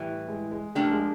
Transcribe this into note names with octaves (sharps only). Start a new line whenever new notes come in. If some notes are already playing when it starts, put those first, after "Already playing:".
Already playing: A2 E3 G3
G#3
G#3
F3 A3 A#3 D4 G4
G#3